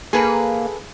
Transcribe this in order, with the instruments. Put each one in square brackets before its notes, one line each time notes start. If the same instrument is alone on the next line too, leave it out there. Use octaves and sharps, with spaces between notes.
[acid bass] A#3 [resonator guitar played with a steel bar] G#4 A4 B4